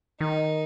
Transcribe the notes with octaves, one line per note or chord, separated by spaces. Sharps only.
D#3 D#4